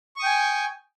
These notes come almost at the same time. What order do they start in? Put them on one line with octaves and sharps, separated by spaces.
C#6 D#6 G5 G#5